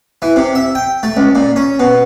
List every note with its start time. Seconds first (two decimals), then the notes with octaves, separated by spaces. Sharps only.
0.22 E3
0.36 C3
0.55 E5
0.75 G5
1.03 A3
1.17 C#2
1.35 A#2
1.56 C#4
1.79 B2